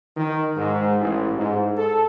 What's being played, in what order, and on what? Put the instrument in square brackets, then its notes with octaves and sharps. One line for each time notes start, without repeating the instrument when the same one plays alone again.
[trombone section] D#3
G#2
A1
G#2
A4